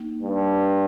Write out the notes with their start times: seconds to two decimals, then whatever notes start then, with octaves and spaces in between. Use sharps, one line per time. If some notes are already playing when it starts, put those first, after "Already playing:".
Already playing: A#3 D#4
0.22 G2